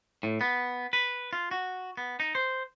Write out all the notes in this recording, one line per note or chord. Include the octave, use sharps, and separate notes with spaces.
A2
B3
B4
F4
F#4
B3
D#4
C5